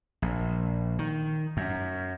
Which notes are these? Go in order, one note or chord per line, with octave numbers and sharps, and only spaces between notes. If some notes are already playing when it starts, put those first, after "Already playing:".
A#1
D#3
F#2